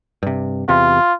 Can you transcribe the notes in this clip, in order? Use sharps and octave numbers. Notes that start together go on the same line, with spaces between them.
G2 C3
E2 C3 F4